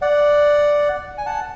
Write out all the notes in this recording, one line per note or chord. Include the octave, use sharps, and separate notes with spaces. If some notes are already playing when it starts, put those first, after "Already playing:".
D5 F#5
G#5
F#5 A5